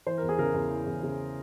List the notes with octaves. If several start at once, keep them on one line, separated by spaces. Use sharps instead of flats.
E3 C5
E2 A#4
G#4
C#3 A#4
E2
E3
E2
C#3